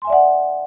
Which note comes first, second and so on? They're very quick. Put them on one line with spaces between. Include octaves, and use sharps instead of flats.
C6 G#5 E5 D5 F#5